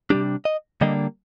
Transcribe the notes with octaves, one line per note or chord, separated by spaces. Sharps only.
C3 G3 D4 G4
D#5
D3 G3 A#3 D4 D#5